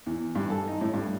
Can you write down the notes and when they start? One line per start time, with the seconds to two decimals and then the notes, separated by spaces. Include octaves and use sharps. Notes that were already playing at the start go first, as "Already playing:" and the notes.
0.06 E2
0.35 G2
0.50 A4
0.67 D#4
0.81 A2
0.93 G2